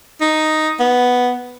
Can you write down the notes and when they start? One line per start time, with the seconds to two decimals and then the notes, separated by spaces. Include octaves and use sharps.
0.21 D#4
0.80 B3